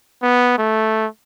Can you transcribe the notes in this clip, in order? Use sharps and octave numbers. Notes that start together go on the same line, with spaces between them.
B3
A3